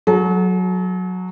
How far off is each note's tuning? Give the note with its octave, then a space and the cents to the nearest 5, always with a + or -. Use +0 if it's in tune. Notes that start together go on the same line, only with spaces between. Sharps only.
F#3 -10 A4 -45